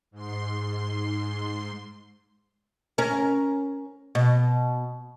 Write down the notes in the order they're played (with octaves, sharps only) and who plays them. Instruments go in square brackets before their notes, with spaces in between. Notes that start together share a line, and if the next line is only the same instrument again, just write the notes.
[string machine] G#2 C6
[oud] C#4 A#4
B2